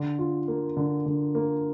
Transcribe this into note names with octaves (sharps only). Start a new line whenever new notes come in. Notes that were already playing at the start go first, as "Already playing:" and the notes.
Already playing: D3
F4
A#3
D3
D3
A#3